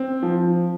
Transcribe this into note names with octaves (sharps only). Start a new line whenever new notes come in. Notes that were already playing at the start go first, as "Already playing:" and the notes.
Already playing: C4
F3